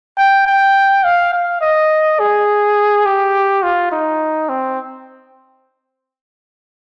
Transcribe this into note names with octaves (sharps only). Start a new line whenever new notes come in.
G5
G5
F5
F5
D#5
G#4
G4
F4
D#4
C4